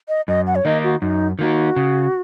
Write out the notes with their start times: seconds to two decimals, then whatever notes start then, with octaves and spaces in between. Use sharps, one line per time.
0.08 D#5
0.28 F#2 D#5
0.47 F#5
0.55 C#5
0.65 D#3 A#3 D#4 D#5
0.84 F#4
1.01 F#2 D#4
1.39 D#3 A#3 D#4 F#4
1.76 C#3